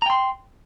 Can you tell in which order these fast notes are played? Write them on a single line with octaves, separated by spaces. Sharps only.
A#5 G5 C6